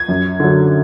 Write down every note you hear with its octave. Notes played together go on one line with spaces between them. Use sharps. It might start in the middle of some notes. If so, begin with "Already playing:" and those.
Already playing: G#6
F#2
D3 F#3